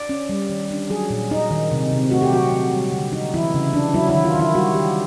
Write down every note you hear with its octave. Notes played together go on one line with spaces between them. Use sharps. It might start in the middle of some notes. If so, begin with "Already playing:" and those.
Already playing: D5
C#4
G3
D#3
D4
F#3 G#4
A#2
D#4
D#3
C3
C3
A3 F#4
G4
F#3 F#4
F#3
G3
D3
D#4
E3 E4
C#3
D4
F#3 E4
E4
D#3
F4
D#3
E4
G3 F#4
D#3 G4